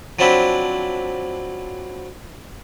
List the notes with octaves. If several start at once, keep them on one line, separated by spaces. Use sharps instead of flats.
F3 F#3 C4 D4 E4 E5